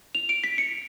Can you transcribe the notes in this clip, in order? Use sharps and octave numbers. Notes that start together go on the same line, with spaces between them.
F7
D7
B6
C#7